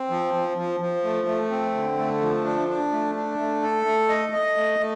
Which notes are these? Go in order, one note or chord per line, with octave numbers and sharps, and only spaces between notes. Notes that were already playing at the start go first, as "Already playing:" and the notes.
Already playing: C4
F3
F3
F3
F3
A3
A3
C4
D3
A3
F3
D4
D4
A3
D4
A3
A4
A3
D#5
D#5
A3
A3